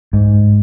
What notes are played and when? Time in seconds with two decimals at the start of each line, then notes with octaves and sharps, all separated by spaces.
0.13 G#2